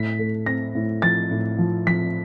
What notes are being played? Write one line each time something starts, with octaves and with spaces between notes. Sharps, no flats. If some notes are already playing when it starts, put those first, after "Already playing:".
Already playing: A2 B6
A3
C4 A#6
A2
F3 A6
A2
F3
F3 B6